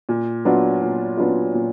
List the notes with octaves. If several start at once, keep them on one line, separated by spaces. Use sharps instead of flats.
A#2
F#3 B3 D4 F4
A#2
F#3 B3 D4 F4
A#2